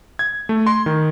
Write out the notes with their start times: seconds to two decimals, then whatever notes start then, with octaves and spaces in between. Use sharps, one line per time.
0.19 G#6
0.49 A3
0.66 C6
0.86 D#3